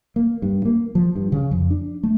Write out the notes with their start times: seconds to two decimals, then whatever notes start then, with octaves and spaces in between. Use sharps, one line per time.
0.16 A#3
0.42 G2
0.65 A#3
0.95 F3
1.15 G2
1.32 C#3
1.51 F2
1.71 D4
2.03 A3